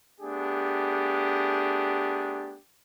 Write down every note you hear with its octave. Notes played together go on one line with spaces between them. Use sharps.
A3 B3 D4 G4 G#4